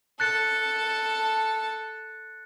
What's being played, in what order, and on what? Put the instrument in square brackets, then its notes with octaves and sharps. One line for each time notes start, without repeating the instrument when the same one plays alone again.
[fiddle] A4 A5 [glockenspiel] F#6 A6 C#7